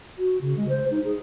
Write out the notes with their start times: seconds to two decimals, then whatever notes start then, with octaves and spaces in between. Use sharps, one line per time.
0.18 F#4
0.41 C#3
0.57 G#3
0.69 C5
0.91 D#4
1.04 G#4